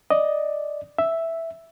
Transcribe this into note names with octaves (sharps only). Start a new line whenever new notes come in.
D5 D#5
E5